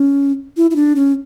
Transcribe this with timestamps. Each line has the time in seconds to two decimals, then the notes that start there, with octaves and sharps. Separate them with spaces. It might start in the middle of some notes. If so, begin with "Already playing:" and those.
Already playing: C#4
0.57 E4
0.71 E4
0.76 D4
0.96 C#4